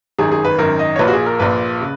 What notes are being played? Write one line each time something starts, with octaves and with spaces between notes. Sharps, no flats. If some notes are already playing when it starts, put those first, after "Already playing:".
G#1 F#2 D#3 G#4
G#4
B4
G#1 F#2 D#3 A#4
D#5
C#5
A#1 A#2 B4
F#4
G#4
A#4
A#1 A#2 B4
C#3